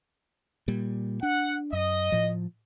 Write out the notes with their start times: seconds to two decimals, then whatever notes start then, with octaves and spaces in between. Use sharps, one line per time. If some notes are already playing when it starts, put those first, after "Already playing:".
0.68 A#2 G3
1.23 D4 F#5
1.73 F#2 D#5
2.12 A2 F3